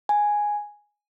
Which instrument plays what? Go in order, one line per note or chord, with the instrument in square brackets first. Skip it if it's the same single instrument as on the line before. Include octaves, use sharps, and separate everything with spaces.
[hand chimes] G#5